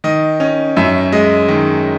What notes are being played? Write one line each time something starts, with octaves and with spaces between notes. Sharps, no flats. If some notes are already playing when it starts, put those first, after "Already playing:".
D#3 D#5
C#4 D#5
F#2 E5
G#3 D#5
D#3